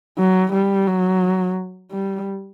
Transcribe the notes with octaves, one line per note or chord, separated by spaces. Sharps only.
F#3
G3
F#3
G3